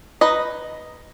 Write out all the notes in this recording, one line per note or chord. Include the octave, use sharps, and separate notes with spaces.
D#4 B4 D#5